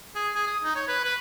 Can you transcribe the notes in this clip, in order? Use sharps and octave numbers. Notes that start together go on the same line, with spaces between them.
G#4
G#4
D#6
D#4
C#5
B4
B4